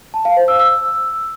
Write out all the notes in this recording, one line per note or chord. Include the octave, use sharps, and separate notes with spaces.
A5
F5
C5
E6
E6